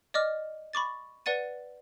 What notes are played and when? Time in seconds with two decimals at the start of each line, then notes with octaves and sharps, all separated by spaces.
0.14 D5 D#5 D6 F6
0.73 B5 C#6 D6 A6
1.26 B4 D5 F#5 A6 D#7